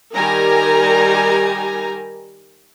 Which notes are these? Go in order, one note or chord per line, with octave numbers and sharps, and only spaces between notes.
D#3 G3 G4 A#4 G#5 A#5